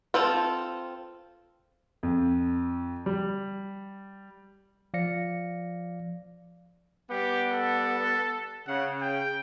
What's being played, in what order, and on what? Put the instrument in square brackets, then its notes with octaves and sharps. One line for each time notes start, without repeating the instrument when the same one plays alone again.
[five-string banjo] C4 F4 A4
[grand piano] F2
G3
[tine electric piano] F3 D5 F5 A#6 C#7
[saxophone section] G3 B3 [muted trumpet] G4
[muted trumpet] A4
[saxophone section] C#3 [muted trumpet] F#5
[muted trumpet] G5